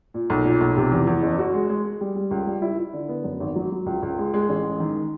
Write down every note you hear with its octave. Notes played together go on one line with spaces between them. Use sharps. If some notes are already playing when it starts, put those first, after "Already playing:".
A#2
B1
A#2
B1
C3
E2
E2
F#1
F#4
G#3
G#3
G#3
G3
G3
C#2
G3
E4
E4
D3
B3
F#2
G#1
F#3
F#3
C#2
C#2
G#3
G#3
A1
G#3
D#3